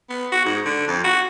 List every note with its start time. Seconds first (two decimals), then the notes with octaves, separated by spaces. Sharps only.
0.10 B3
0.32 F#4
0.46 G#2
0.65 D3
0.88 F2
1.04 F#4